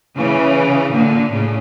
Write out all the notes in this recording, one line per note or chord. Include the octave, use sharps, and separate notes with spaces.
C#3 E3
A#2 D3
A2 C#3